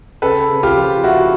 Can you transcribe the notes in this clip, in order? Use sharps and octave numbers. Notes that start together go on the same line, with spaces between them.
C#3 A4 B4
C#3
F4 G4
F3
C#3 E4 F#4